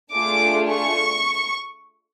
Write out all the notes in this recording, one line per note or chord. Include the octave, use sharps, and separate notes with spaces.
A3 D4 F4 G#4 D6
C#6